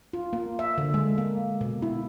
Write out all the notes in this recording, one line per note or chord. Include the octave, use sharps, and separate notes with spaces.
F4
A#3
E5
D3
G#3
A#3
B2
E4